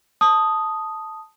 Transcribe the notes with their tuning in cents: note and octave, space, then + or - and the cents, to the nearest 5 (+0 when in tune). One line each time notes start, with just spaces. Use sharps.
A5 +0 D#6 +0